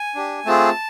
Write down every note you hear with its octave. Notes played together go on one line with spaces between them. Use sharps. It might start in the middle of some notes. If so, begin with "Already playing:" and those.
Already playing: G#5
D4 G4
A3 C4 F4 G#4 A5